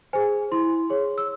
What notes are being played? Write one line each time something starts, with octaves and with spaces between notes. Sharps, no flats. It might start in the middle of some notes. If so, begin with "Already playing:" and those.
G#4 C5 G#5
E4 C6
G#4 C#5
E6